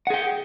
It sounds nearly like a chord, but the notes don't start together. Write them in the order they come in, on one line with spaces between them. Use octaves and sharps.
F#5 G#4 G5